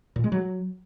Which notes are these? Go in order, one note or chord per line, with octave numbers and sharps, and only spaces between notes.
A#2
G#3
F#3